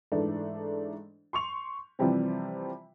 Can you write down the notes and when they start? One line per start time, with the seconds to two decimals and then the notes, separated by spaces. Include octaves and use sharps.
0.12 G#2 E3 A3 D4
1.33 C6 C#6 F7
1.99 C3 E3 F3 G3 C4